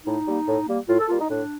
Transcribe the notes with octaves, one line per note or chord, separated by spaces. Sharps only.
A2 D#4
G3 A#3
A2
G3 A#3
A2 F4
A4
G3 A#3 F4
D#4
A2 D4